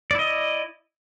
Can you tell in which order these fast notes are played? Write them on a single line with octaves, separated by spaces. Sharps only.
D5 E4 D#5